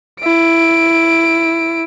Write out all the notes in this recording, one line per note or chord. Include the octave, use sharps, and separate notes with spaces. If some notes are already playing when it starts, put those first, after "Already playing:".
E4 D7